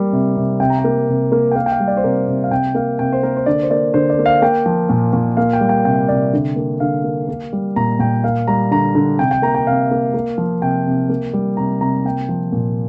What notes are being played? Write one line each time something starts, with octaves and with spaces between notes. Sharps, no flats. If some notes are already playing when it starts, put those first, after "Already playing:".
Already playing: G3 A#3
C3
C3
C3 G5
A#5
G5
A#3
C3
A#3
G5
A#3 F5
G5
F5
G3
D5
C5
C3 A#4
C3
F5
C3 G5
A#3 F5
C3 G5
C5
A#3 A#4
C5
D3 D5
C5
A#3 D5
D3 C5
D5
A#3
F5
A#3 G5
F3
A#2
A#2
A#3 F5
G5
G3
G5
C3 G5
C3 D5
D3
A#3
D3 F5
A#3
A#3
G3
A#2 A#5
A#2 G5
A#3 F5
G3 A#5
D3 A#5
D3
C3 G5
G5
A#3 A#5
G5
C3 F5
A#3
A#3
F3
C3 G5
C3
A#3
G3
C3 A#5
C3 A#5
A#3 G5
F3
A#2